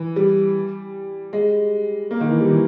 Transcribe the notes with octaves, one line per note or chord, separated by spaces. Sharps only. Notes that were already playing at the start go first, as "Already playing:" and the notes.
Already playing: E3
G3
G#3
A#3
D#3
E3
G3
E3